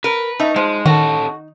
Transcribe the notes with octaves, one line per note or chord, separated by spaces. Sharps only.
A#4 B4
A3 D#4
F3 G#3
D#3 C#4 F#4 A4